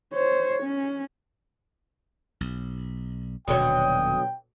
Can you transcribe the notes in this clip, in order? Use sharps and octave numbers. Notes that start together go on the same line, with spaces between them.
C5 C#5
C#4
B1
D#1 B2 D3 F#3 G5 D#6